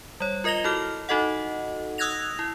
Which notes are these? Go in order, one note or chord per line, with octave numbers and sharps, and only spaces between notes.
G3 C#5
F4 A#4 D#5 A#6 F7 G7
E4 F#4 A4 F6
D#4 F#4 A4 D#5 F#5
D#6 E6 F#6 G#6 A#6 F7
E4